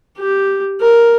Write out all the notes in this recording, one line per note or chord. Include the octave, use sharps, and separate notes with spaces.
G4
A#4